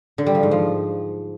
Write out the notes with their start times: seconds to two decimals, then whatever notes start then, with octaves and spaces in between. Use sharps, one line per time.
0.18 D3
0.26 G3
0.35 F3
0.43 G#2
0.51 F3